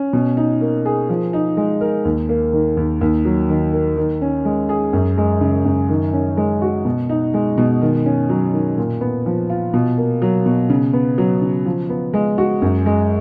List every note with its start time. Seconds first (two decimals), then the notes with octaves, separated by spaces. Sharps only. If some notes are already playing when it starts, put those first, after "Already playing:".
Already playing: C#4
0.13 B2
0.37 D#4
0.61 A#3
0.86 G#4
1.09 F3
1.33 D#4
1.57 G#3
1.81 A#4
2.05 D#2
2.29 A#3
2.53 D#3
2.77 D#2
3.01 D#2
3.25 F#3
3.49 D#3
3.73 A#3
3.97 D#3
4.22 C#4
4.45 G#3
4.69 G#4
4.93 F#2
5.18 G#3
5.41 C#3
5.65 F#2
5.89 D#3
6.13 C#4
6.37 G#3
6.62 F#4
6.85 B2
7.09 D#4
7.34 G#3
7.58 B2
7.82 D#3
8.06 C#4
8.29 F#3
8.53 D#3
8.78 A#2
9.01 B3
9.26 F3
9.50 F4
9.74 B2
9.98 A#3
10.22 F#3
10.46 B2
10.70 C#3
10.93 B3
11.18 F#3
11.42 C#3
11.66 F3
11.90 B3
12.14 G#3
12.38 F#4
12.62 F#2
12.86 G#3